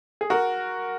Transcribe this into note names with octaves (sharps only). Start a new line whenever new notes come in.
G#4
F#4 A#4